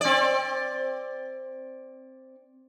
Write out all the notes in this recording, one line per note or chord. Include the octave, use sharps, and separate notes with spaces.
C4 D5